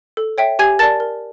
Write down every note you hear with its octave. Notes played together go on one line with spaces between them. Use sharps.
A4
C#5 E5 G5
G4 G#5 G#6
A#4 D5 A5 A6
A#4